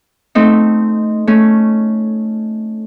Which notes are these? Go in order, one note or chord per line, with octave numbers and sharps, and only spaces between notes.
A3 C4 D#4
A3 C#4